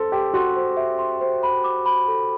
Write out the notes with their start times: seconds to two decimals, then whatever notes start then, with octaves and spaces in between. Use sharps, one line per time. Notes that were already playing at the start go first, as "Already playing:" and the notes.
Already playing: A4 C5 C6
0.12 G4 C6
0.34 F#4 C6
0.56 C5
0.77 E5
0.99 C6
1.21 C5
1.43 B5
1.64 D6
1.86 B5
2.08 A4